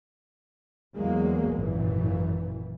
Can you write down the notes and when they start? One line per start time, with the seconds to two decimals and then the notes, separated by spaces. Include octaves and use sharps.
0.97 E2 F#3 G#3 A#3
1.54 G#1 F#2 A#2 E3